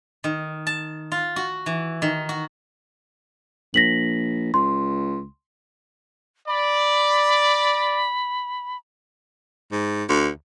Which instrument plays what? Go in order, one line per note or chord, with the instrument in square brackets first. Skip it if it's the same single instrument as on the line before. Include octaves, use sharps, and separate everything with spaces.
[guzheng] D#3
A5
F4
F#4
E3
D#3
F#4
[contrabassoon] A#1 [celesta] A#6 B6 F#7
[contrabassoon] C#2 [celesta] C6
[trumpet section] D5 [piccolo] B5
[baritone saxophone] G#2
D2